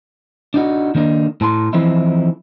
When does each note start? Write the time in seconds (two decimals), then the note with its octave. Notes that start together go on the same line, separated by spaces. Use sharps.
0.54 D4 D#4 F#4
0.95 D#3 A#3 D4 D#4
1.41 A2 A5 C6
1.73 E3 F3 C4 D#4 E4